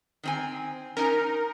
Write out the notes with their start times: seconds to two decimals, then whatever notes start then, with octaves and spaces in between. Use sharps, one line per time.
0.23 D#3 C4 G#5
0.97 C#4 D#4 A#4